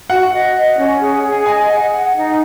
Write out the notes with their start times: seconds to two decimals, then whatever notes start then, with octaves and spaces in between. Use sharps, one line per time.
0.09 F#4 F#5
0.33 D#5
0.56 D#5
0.77 C#4
1.00 G#4
1.23 G#4
1.45 D#5 G#5
1.68 F#5
1.91 F#5
2.14 D#4